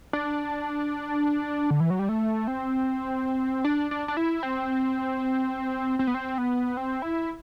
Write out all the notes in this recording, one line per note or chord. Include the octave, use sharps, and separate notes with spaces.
D4
D3
E3
F#3
G3
A3
C4
D4
D4
D4
E4
C4
C4
B3
C4
B3
C4
E4